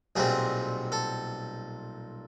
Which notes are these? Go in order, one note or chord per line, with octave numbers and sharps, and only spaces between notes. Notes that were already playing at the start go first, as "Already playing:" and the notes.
B1 A#2 G3 C4 G#4
A4